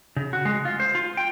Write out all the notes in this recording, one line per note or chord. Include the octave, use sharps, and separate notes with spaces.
C#3
F#4
G#3
F4
C5
F4
G5